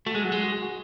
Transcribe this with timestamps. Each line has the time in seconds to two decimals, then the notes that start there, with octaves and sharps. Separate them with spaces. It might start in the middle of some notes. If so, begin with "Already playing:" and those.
0.06 A3 F#4
0.15 G#3 G#4
0.24 F#3 F#4
0.32 G#3 G#4
0.44 F#4
0.52 G#4
0.62 F#4